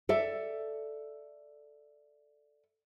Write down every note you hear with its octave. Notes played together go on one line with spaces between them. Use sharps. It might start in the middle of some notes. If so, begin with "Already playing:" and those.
A4 D5 E5